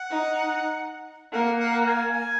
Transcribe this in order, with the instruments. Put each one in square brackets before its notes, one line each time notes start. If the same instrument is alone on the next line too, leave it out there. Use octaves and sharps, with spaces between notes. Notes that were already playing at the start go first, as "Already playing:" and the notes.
Already playing: [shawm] F#5
[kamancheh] D#4
[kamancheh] A#3 [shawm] F#5
[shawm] F#5
G#5
G#5